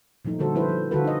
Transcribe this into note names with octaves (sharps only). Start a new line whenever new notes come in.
A#2 F3 A3 D#4
D3 G3 F#4 A4 C5
F3 A3 E4 A4 B4 C5
F3
D3 F4 F#4 A4 B4
D#4 D#5